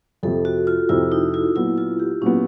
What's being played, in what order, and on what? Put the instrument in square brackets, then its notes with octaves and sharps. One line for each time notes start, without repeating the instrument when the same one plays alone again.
[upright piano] F2 C3 F3 [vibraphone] A4
[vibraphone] F#4
F4
[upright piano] F2 C3 F3 [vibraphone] E4
[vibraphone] D#4
E4
[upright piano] A#2 F#3 B3 [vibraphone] E4
[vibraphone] F4
G4
[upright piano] A#2 F#3 B3 [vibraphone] C#4